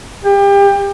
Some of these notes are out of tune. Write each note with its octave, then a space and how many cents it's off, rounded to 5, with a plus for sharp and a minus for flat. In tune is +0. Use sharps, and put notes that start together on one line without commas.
G4 +30